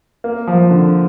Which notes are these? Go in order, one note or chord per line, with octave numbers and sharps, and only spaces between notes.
A#3
F3
D3